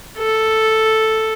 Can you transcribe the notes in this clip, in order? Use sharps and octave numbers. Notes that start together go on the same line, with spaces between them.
A4